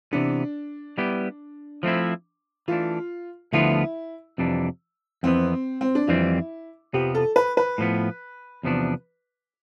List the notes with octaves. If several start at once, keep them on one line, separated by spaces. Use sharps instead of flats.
C3 E3 B3 D4
G3 B3 E4 G4
F3 A3 C4 E4
E3 A3 D4 F4
D2 D3 F3 B3 E4 F4
F2 C3 E3 G3 D4
F2 E3 B3 C4
C4
D4
F2 E3 G3 C4 E4
F2 C3 F3 B3 G4
A4
B4
B4
A2 F3 B3
E2 C3 F3 B3 D4